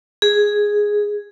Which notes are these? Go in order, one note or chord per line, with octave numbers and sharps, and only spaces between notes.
G#4